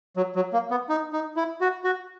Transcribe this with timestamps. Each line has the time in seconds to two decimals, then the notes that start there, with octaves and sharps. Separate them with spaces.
0.17 F#3
0.35 F#3
0.53 A#3
0.71 B3
0.89 D#4
1.13 D#4
1.36 E4
1.61 F#4
1.84 F#4